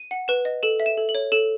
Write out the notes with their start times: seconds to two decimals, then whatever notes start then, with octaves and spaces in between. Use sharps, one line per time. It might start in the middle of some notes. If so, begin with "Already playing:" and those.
Already playing: D#7
0.11 F#5
0.28 B4 E7
0.45 D#5
0.63 A4 E7
0.80 E5
0.86 E7
0.97 A4
1.09 F#7
1.15 C#5
1.32 A4 E7